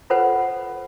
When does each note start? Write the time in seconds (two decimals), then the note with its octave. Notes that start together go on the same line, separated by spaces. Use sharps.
0.10 F4 A4 B4 C5 F#5